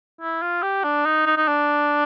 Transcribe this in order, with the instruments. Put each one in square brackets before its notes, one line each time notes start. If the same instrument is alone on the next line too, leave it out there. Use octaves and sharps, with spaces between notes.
[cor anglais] E4
F4
G4
D4
D#4
D#4
D#4
D4